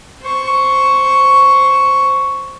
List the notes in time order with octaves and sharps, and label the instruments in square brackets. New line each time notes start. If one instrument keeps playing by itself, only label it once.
[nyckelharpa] C5 C#6